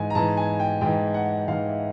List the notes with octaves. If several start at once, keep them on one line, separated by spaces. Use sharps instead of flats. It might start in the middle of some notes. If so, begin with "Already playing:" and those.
Already playing: G#2 E3 G#5
A#5
G#2 E3 A5
G#5
G5
G#2 E3 G5
F#5
G#2 E3 F5
E5